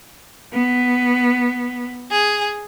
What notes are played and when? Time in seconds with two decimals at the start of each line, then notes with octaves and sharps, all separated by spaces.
0.51 B3
2.10 G#4